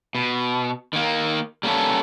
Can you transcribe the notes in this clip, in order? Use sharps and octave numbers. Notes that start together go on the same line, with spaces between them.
B2
D#3 A#3
G3 A#3 B3 C#4 A4